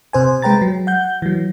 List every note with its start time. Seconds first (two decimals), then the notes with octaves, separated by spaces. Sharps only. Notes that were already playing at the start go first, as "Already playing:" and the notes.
0.13 C3 C5 G#5
0.42 G#3 B4 G5 A#5 A6
0.61 F#3
0.87 F#5 G6
1.22 E3 F#3